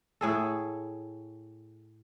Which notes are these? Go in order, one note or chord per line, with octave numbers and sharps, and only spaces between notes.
A2 G#4 A4